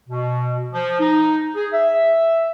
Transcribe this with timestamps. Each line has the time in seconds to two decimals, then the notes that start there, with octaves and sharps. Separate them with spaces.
0.09 B2
0.73 F3
1.00 D#4
1.55 G#4
1.72 E5